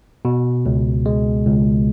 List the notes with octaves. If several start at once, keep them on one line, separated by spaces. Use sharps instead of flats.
B2
C#2
G#3
C#2